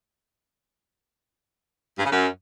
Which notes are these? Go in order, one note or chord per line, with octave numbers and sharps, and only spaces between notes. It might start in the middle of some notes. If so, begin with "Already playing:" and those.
G2
C#3
F#2